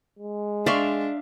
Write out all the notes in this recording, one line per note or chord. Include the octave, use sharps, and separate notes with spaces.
G#3
D4 D5 E5 F5 C6 C#6